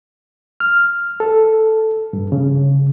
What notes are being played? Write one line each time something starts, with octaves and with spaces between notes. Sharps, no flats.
F6
A4
G2
C#3